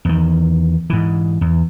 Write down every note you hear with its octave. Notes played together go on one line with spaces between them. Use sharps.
E2 D#3
G#2 E3
E2